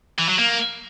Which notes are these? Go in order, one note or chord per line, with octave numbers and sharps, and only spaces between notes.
E3
F#3
A#3